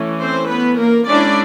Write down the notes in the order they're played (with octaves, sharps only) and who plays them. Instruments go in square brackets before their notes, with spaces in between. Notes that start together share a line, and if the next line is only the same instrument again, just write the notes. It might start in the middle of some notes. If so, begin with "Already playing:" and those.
Already playing: [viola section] E3 A3 C#4
C4 C5
B3 B4
A#3 A#4
G#3 C#4 D4 E4 D5